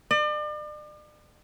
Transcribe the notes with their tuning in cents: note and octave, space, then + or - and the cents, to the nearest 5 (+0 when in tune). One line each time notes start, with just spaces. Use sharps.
D5 +40